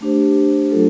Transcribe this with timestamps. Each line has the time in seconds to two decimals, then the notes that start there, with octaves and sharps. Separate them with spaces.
0.01 A3 D4 G4 C5
0.71 F#3 A3 D4 F4 A4